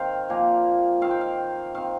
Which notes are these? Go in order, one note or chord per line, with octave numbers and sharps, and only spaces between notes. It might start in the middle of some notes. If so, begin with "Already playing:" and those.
Already playing: D#3 C4 F5 G5
A#2 F3 A#3
D#3 C4 F5
G5
F5
D#3 C4 F5